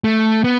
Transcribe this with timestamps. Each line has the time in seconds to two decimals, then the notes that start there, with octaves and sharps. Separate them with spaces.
0.04 A3
0.44 B3